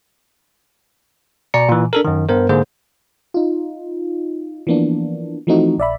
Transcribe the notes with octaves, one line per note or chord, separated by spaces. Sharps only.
B2 D5 A#5 C#7
A#2 E3
D4 A4 A#4
F#2 D#3
G2 B3 A#4 C5
G#2 D3 A#3 G#4 C5
D#4 F4
E3 F3 A#3 B3 D4
E3 F3 A3 C4 D#4 F#4
A#1 D5 E5 B5